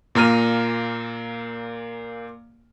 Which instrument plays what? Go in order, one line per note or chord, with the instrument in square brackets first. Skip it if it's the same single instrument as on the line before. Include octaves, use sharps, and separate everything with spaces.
[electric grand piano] A#2 A#3 A#5 F6 D#7